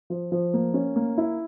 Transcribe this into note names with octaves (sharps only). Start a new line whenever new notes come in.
F3
F3
A#3
C#4
A#3
E4